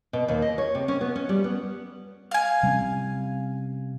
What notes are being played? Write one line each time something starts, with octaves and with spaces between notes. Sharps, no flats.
B2
D#2
D#5
C#5
C3
C#4
B3
C#4
G3
B3
F5 G#5
C3 G3 C#4